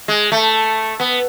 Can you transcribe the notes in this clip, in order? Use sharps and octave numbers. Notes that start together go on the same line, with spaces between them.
G#3
A3
B3